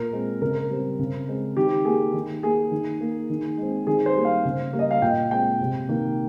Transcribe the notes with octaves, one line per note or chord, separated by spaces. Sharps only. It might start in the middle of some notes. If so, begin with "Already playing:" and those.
Already playing: A#2 A#4
G#3 C4
C#3 A#4
G3 C4
C#3
G#3 C4
D#3 G4
A#3 G#4
D#3
A#3 G#4
D#3
A#3
D#3
G#3 C4
D#3 G#4
C5
G3 A#3
F5
C#3
G3 A#3
D#5
F5
A#2 G5
G#3 C4 G5
C3
D#3 A#3